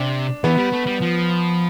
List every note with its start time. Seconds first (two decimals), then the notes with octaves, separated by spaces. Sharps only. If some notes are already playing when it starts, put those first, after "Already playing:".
Already playing: C3 D4
0.44 E3 B3
0.58 G3
0.73 A3
0.87 G3
1.02 F3